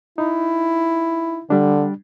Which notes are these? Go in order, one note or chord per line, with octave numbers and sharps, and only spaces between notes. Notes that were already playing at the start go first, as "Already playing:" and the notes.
D#4 E4
D3 G3 D4